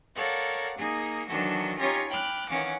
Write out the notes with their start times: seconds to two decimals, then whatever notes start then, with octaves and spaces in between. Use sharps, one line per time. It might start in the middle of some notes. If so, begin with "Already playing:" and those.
0.16 A4 A#4 C#5 D5 F5 F#5
0.77 A#3 D#4 G#4
1.28 D#3 E3 F#3 D4 F#4 A4
1.78 C#4 D#4 F4 G4 C#5 A#5
2.09 G5 B5 D6 F6 F#6
2.48 D#3 E3 C#4 F5 F#5 D6